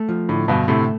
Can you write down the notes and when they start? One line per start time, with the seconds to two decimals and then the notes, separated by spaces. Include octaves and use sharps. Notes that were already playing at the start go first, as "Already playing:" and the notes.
Already playing: A3
0.09 F3
0.29 A2 D3
0.48 G2 B2 D3
0.68 A2 C3 A3